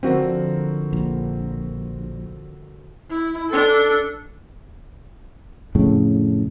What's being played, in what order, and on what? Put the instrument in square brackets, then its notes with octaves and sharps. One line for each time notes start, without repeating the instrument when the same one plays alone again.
[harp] D3 F3 [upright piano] C4 F#4 A#4
[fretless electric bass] A#1
[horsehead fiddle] E4
D4 A4
[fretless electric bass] F2 A2 C#3